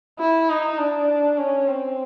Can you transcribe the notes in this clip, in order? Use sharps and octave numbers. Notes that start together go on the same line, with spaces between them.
E4
D#4
D4
C#4
C4